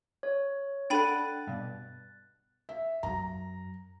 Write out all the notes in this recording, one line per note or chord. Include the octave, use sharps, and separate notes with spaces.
C#5
D4 A4 F#5 G5 B5 F#6 A6 D#7
G2 B2
E5
F#2 A#5